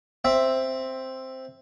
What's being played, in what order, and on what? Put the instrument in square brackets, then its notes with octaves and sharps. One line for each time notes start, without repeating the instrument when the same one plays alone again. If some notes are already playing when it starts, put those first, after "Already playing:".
[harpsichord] C4 E5